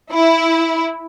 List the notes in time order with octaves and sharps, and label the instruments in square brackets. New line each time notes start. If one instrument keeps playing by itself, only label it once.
[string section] E4